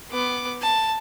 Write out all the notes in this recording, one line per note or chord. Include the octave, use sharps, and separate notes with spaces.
B3 D6
A5